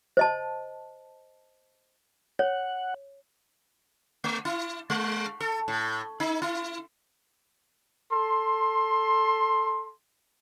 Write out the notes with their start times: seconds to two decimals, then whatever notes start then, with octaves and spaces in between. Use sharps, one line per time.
0.17 C5 D#5 A5
2.39 C#5 F#5
4.24 A3
4.45 E4
4.90 G#3
5.40 A4
5.68 A2
6.20 D#4
6.42 E4
8.13 A4 C6